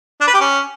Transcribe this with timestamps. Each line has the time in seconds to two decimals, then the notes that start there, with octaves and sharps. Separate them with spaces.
0.21 D4
0.27 B4
0.34 G4
0.40 C#4